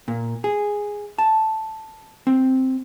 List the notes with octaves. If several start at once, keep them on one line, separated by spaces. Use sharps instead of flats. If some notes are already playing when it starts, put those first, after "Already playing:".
A#2
G#4
A5
C4